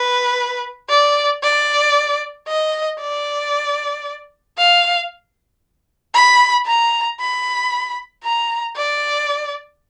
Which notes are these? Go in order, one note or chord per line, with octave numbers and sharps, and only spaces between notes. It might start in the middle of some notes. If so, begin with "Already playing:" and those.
Already playing: B4
D5
D5
D#5
D5
F5
B5
A#5
B5
A#5
D5